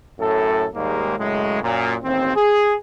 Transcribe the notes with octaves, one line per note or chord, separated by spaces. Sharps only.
F#2 A2 A4
D#2 G#2 G3 G#3 A#3
F#2 A2 C#3 G#3
F#2 A#2
A1 D#2 C4
G#4